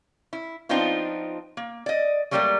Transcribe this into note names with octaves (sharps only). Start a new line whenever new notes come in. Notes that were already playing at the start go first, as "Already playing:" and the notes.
E4
F3 B3 C4 D4 D#4 F4
A#3
D5 D#5
F#3 G3 A3 A#3 G4 D5